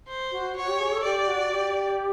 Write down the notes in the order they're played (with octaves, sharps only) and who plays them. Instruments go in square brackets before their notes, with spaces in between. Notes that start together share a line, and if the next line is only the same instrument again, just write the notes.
[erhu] C5
[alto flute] F#4
[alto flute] F#4 [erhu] C#5
[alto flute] G4
G#4
A4
[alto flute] G4 [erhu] D5
[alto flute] F#4
G4